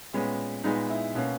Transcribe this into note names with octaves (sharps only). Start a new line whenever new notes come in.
A#2 G#3 B3 C#4
A#2 G#3 B3 D#4
E4
B2 A#3 C#4